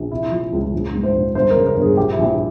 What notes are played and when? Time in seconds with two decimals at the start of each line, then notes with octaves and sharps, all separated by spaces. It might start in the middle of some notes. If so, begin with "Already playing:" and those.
Already playing: A#1
0.11 C3 E4
0.32 F3
0.53 C#2
0.73 A#1
0.93 G#2
1.03 C5
1.15 A#1
1.35 G1 C5
1.51 A#4
1.56 C#3
1.66 A#4
1.77 G1 G#4
1.97 A#1 G4
2.12 E4
2.18 A#1